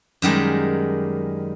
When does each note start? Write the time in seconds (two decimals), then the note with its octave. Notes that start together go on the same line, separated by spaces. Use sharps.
0.22 F#2 D#3 G3 G#3